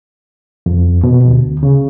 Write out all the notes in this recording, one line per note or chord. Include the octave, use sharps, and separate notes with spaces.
F2
B2
D2
C#3